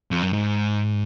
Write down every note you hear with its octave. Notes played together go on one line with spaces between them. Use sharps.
F2
F#2
G#2